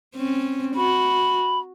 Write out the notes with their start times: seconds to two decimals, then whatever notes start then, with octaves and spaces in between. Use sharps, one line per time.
0.16 C4 C#4
0.76 F#4 B5